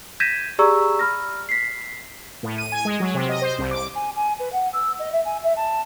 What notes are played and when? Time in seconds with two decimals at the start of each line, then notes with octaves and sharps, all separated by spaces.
0.20 G6 G#6 A#6 B6 D#7 E7
0.59 G4 G#4 D5 A#5 C#6 E6
0.99 B5 F6 A#6
1.49 B6 C7
2.43 A2
2.58 D#7
2.72 G#5
2.85 G#3
3.00 F#3
3.14 C3
3.29 D#5
3.42 C5
3.58 C2
3.71 D6
3.95 G#5
4.16 G#5
4.39 B4
4.52 F#5
4.73 E6
4.99 D#5
5.12 E5
5.25 G#5
5.43 E5
5.56 A5